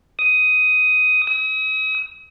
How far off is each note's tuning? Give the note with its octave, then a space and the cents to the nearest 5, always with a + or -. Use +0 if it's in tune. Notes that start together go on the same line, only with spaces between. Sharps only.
D#6 +10
D#6 +40